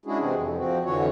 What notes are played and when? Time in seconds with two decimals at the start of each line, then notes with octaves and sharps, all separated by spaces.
0.06 G#3 C#4 D4 E4 F#4 G#4
0.20 C3 E3 C4 F#4 G#4
0.34 F2
0.58 F3 C4 F#4
0.85 F2 D3 E3 F#4 C#5